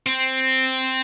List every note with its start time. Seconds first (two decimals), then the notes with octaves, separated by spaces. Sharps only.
0.06 C4